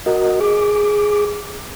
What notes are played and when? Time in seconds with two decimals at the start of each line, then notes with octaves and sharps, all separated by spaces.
0.06 F#4 A#4 D#5
0.40 G#4 D6